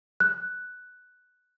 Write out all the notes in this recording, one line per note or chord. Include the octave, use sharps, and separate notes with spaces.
F#6